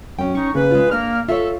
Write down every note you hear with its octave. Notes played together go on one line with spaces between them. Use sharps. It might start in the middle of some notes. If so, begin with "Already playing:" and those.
F#2 C#4 G5
D#4 C#6
C#3 A#3 B4
G#3 F4
A#3 D4 F6
F4 A4 C#5 E5